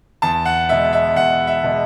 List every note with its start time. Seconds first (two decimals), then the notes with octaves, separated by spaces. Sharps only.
0.22 E2 A5
0.45 F#5
0.69 B2 G#3 E5
0.93 E5
1.16 E2 F#5
1.47 E5
1.64 B2 G#3